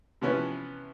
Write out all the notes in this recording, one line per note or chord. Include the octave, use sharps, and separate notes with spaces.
C3 E3 F3 B3 C#4 B4